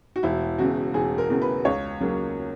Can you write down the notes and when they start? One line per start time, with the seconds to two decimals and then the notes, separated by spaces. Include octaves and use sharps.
0.16 F#4
0.23 E1 E4
0.59 E2 C#3 F#4
0.94 E1 G#4
1.18 A#4
1.30 E2 C#3
1.42 B4
1.65 C#2 C#5
2.00 C#3 F#3 A#3